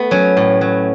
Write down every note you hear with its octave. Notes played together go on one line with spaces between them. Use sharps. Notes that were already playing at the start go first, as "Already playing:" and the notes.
Already playing: A3 B3
F#3 C#4
A2
F#3